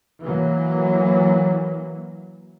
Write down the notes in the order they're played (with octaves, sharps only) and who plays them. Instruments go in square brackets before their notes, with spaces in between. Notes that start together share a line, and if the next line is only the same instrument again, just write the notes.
[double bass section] E3 F#3 A#3